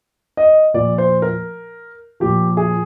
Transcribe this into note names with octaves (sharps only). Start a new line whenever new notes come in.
D#5
A#2 F3 D5
C5
A#4
A#2 F3 G4
G#4